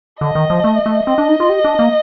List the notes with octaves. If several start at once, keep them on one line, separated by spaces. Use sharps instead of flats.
D3 D#5
D#3
F3
A3
A3
C4 D#5
D4
D#4
F4
G4
D4
A#3